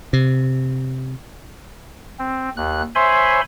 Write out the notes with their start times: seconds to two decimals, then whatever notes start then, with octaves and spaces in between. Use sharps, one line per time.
0.13 C3
2.19 C4
2.57 D#2 F#6
2.95 C5 C#5 E5 G#5 B5 C6